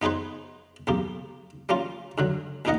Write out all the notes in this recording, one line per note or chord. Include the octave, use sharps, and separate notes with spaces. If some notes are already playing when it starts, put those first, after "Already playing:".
B3 D#4 G#4 B4 C5
B1 E2 A#3 G4
G3 A#3 C#4 F4
G2 D3 F#3
A1 D#2 A#2 D#4 D#5 F#5